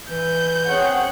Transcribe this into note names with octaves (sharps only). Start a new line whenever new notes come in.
E3 G6
C4 C#4 G#4 C#5 F#5